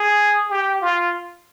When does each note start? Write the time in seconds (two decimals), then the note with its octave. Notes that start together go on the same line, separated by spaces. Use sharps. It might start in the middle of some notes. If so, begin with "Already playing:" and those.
Already playing: G#4
0.50 G4
0.82 F4